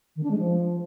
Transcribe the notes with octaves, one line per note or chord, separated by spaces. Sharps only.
D#3
D4
G#3
F3